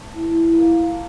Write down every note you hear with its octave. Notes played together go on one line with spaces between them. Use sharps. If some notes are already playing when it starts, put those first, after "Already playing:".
Already playing: A3
E3
E4
E3
A#3
F3
D4